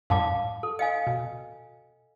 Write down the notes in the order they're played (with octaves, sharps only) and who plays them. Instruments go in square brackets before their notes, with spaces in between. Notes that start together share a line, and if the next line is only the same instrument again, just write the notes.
[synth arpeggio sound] F#2 A2 G3 [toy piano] F5 A5 D6
[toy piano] A4
[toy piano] D#5 F5 G#5 [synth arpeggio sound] C#7
[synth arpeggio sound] B2